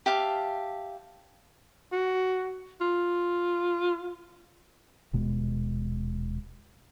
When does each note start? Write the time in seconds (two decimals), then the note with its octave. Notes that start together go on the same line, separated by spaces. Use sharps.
0.06 G4 E5 F5 A5
1.92 F#4
2.81 F4
5.13 D#1 B2 G#3